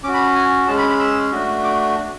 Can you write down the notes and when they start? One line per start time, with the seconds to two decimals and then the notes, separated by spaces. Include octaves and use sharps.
0.03 C#4 D6
0.08 F#4
0.14 B5
0.35 G#5
0.68 G#3 C#4 G#4 A5
0.78 B5
0.89 B5
1.00 E6
1.32 A3 D4 F#4
1.64 D6